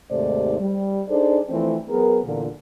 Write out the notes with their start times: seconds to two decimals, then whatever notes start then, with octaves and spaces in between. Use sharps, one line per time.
0.11 D#2 G#2 C3 A3 C5 D5
0.60 G3
1.09 D4 D#4 G#4 A4 C5 D5
1.49 E3 F3 A3 C4
1.89 F#3 B3 G#4 A#4
2.25 E2 A#2 D3